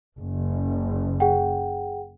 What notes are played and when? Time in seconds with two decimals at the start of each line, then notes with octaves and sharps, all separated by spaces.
0.18 F#1
1.20 G#4 F#5 G5